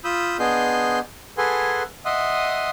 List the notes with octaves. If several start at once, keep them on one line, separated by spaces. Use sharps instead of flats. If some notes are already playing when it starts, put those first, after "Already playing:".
F4 B5 D#6 E6 G6
B3 D4 G#4 D#5 C6 G6
G#4 A4 B4 F#5 G#5 C6
D#5 E5 F#5 C6 D#6